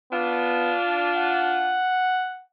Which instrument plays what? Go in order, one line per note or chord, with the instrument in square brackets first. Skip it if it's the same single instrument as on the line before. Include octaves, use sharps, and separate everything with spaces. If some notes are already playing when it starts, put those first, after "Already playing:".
[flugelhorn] B3 [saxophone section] D4 F4
[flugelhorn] F#5